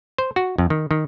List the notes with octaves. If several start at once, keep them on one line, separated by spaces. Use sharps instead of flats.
C5
F#4
F2
D#3
D#3